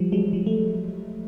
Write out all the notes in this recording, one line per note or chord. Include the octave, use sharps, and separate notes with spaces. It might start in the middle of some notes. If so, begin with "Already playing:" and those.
Already playing: F3 G3
F#3 G#3
F3 G3
A3